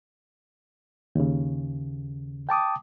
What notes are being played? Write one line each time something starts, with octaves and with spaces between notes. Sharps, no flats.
D#2 C#3
G5 A5 D6 D#6